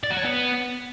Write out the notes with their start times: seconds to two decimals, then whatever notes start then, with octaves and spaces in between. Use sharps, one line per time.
0.04 D5
0.10 F#4
0.17 C#5
0.24 B3